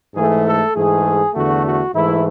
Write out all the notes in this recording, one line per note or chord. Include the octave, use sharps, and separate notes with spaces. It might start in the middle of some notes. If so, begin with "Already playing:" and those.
G#2 E3 A3 G#4
A4
G#2 E3 A3 G#4
E2 D3 A3 F#4
F#4
G#2 E3 A3 E4